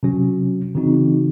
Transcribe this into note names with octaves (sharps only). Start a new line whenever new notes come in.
C3 F#3 C#4 F#4
C#3 E3 C4 D#4 F#4